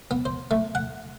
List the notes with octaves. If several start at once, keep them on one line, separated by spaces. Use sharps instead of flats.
B3
C5
A3
F#5